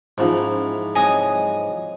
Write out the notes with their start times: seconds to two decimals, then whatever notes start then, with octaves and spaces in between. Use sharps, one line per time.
0.18 G#2 E3 F3 C#4 D#4 C5
0.95 C3 F#3 G#3 G#5 D#6